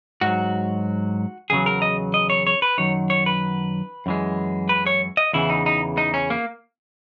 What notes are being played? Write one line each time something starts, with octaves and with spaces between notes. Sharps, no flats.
G#2 F#3 F#4
E2 C#3 F#3 G#4
A#4
D#5
D#5
C#5
C#5
B4
F#2 D#3 F#3 C#5
C#5
B4
F#2 E3 G#3
B4
C#5
D#5
E2 C#3 E3 E4
D#4
D#4
D#4
C#4
A#3